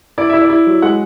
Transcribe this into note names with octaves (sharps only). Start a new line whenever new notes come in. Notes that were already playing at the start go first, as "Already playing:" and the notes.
E4 D5
E4 E5
D5
E4
F#3
G#3 F#5